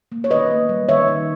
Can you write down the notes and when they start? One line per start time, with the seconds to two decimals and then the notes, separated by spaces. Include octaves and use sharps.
0.12 A#3
0.24 C#5
0.30 D#3 B4 D#5
0.51 A#3
0.69 G3
0.89 D#3 C#5 E5
1.08 D#3